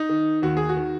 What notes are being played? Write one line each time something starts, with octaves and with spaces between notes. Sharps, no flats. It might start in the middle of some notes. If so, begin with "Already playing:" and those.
Already playing: D#4
D#3
D#2 F#4
G#4
F#4
D#3